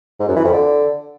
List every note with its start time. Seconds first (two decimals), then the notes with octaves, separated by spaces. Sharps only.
0.19 G#2
0.28 F#2
0.36 E3
0.44 F2
0.52 D3